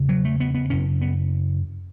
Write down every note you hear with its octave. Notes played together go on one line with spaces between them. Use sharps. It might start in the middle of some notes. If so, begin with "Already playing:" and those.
Already playing: E2 C#3
F#3
A3
B3
B3
F#2 C#3 C#4
B3